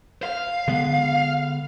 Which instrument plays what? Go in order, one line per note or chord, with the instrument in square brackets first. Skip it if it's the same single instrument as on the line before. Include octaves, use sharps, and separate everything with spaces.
[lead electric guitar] F5
[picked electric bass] D3 G#3 B3